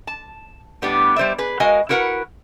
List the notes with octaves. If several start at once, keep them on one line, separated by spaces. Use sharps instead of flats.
A5
A2 G3 B3 D4 G4
G3 C5 D5 E5
G#4 B4
G#3 F#4 A#4 D#5 F5 G#5
E4 F#4 A#4 B4 F#5